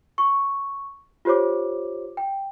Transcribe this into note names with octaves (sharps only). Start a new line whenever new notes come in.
C#6
F4 G4 C5 C#5 D6
G5